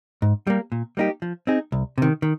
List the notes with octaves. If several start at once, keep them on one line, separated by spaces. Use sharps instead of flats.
G#2
G3 A#3
A#2
G3 A#3 D#4 G4
F3
C4 D#4 G#4
C2
C3 D#3
D#3